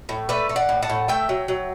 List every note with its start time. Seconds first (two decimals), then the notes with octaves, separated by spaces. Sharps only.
0.09 A2
0.29 A3 B4 D5
0.49 A3
0.56 D5 F#5
0.69 A2
0.83 F#5 A5
0.89 A2
1.08 A3 E5 G5
1.29 F#3
1.48 F#3